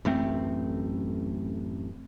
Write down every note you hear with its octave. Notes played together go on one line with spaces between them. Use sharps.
A1 F#2 A3 C4